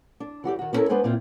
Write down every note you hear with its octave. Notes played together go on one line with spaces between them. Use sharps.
D4
E3 F#4 G4 D5
D#3 F#4
B3 C#4 E4 G4 A4 A#4
G#3 B3 D4 B4 C5 G#5
A#2 C4 E4 F4